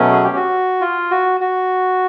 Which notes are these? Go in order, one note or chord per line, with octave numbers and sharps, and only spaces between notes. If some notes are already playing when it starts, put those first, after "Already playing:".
Already playing: B2 F#3 A3 C#4
G#4
G4
F#4
F4
F#4
F#4